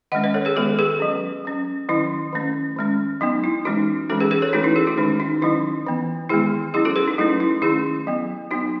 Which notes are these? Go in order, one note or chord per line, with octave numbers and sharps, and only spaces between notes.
D#3 G#3 C#4 D#5 F#5
B4 D#5
A4 C#5
G#4 B4
D#3 G#3 B3 F#4 A4
G#4 B4
F#3 C#4
F#3 C#4
D#3 F#3 C#4 E4
D#3 A3 C#4
D#3 G#3 C#4
F#3 B3 D#4
E4
E3 G#3 C#4 D#4 F#4
E3 G#3 C#4 F#4 A4
G#4 B4
G#4 B4
A4 C#5
E3 A3 C#4 D#4 F#4
E4
E4 G#4
D#4 F#4
D#3 G#3 C#4
D#4
D#3 F#3 C#4 E4
E3 B3
D#3 G#3 B3 E4 G#4
F#3 C#4 E4 G#4
F#4 A4
G#4 B4
D#4
F#3 A3 C#4 E4
E4
D#3 A3 C#4 E4 G#4
F#3 B3
F#3 B3 D#4 F#4